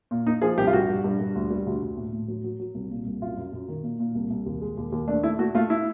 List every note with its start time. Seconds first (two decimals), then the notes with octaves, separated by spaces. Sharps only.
0.11 A#2
0.26 A#2 D#4
0.42 F3 G#4
0.58 C2 G4
0.67 F4
0.73 G2 F#4
0.89 G2
1.04 G2
1.20 G2
1.35 D2
1.50 G3
1.66 D2
1.82 D2
1.97 A2
2.13 A2
2.28 F#3
2.44 F#3
2.60 F#3
2.75 C2
2.91 A#2
3.06 C2
3.22 F#2 F4
3.37 F#2
3.53 F#2
3.69 D#3
3.83 A#2
3.99 A#2
4.15 C2
4.30 C2
4.46 D#2
4.61 G#3
4.77 D#2
4.92 D#2
5.08 A3 D4
5.23 A3 E4
5.39 A3 F#4
5.55 A3 F4
5.70 E4